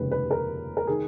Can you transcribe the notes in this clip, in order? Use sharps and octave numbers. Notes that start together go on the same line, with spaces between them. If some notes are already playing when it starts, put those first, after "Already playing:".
Already playing: F1 D#2 C#3 G#3 B4
B4
A#4
A#4
D#3 G#4